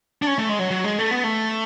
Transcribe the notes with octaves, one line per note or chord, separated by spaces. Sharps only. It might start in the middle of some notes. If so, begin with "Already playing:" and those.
D4
C#4
A3
G#3
F#3
F#3
G#3
A3
B3
A3